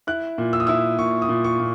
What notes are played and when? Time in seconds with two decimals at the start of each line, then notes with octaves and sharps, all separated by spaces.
0.07 E4 F#6
0.38 A#2
0.53 E6
0.60 D#6
0.67 E4 E6
0.99 A#2 C#6
1.22 D#6
1.29 A#2
1.44 C#6
1.60 A#2